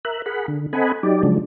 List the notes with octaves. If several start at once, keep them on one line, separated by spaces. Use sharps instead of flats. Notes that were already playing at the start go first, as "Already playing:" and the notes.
A#4 E5 F#6
G#4 A#4 F#5 B5
D3
C4 A4 D#5 F#5 G#5 B5
F#3 D#4 G4 D5
C#3 F3 F#3 G#3 D4